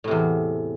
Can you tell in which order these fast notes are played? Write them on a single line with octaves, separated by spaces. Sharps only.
A2 C3 E2